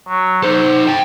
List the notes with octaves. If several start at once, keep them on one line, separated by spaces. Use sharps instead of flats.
F#3
D#4 A4 C5
G5 A5